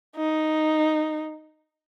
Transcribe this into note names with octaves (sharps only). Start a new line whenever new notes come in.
D#4